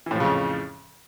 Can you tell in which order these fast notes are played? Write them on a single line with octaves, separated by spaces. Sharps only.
E3 A2 F3 C#3 F2